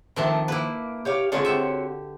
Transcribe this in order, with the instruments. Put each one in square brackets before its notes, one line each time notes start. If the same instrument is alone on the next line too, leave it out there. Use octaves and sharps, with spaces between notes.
[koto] D#3 F3 D4 [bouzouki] A3 C4
[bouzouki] A#3 [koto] E4 B4
[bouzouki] G4 C#5 F5
[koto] D3 G#3 F4 [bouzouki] C4 F#4 C#5
[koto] G4 E5